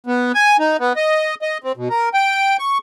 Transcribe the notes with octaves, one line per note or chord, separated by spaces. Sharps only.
B3
G#5
D#4
B3
D#5
D#5
C4
B2
A#4
G5
C#6